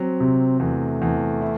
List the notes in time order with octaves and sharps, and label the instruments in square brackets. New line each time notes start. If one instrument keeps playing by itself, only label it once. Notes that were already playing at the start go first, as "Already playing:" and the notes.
Already playing: [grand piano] F#3 [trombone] C4
[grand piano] C3
[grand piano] E2 [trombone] A3
[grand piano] E2
E4